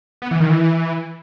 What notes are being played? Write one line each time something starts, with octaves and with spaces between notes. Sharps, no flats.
B3
E3
D#3
E3